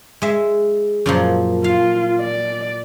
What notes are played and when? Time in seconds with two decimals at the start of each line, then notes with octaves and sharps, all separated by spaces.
0.22 G#3 E5
1.06 F#2 A#2 F3
1.64 F4 F5
2.20 D5